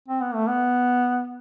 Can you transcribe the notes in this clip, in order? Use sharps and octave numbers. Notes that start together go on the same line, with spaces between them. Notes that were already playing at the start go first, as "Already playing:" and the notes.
C4
B3
A3
B3